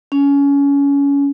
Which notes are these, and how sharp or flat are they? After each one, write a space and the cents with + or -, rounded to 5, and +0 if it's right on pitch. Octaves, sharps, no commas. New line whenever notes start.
C#4 +25